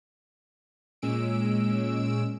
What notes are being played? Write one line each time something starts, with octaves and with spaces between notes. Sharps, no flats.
A#2 G#3 C#4 E6 D7